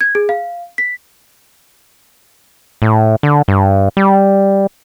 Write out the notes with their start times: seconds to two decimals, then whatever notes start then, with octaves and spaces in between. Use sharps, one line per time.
0.01 G#6
0.15 G#4
0.29 F5
0.78 B6
2.82 A2
3.23 D3
3.48 G2
3.97 G3